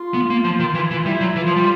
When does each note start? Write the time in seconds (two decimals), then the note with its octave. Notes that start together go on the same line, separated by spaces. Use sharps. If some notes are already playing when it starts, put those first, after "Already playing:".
Already playing: F4
0.14 B3
0.30 A#3
0.44 F3
0.59 D#3
0.75 E3
0.91 E3
1.05 G3 E4
1.21 F#3
1.36 E3 F4
1.46 F3
1.56 G3